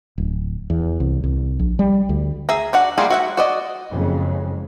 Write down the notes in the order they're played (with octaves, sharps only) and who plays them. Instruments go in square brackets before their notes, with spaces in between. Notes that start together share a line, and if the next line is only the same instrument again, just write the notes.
[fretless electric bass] D1
E2
C2
C2
A#1
G3
D2
[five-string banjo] G#4 E5 A#5
D4 F#4 F#5
G3 A3 A#3 F4 G#4
F#4 E5 F#5
F#4 D5 D#5
[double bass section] F#1 F2 C#3 G#3